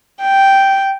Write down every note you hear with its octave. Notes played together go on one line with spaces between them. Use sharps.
G5